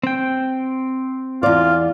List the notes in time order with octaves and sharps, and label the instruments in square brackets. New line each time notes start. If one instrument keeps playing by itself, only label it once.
[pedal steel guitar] C4 G5
[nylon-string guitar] E2 D5 [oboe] F4